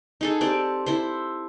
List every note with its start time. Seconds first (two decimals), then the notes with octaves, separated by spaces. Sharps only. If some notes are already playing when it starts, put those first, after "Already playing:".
0.21 D#4 G#4 A4
0.41 C4 G4 D5
0.86 E4 A4 C5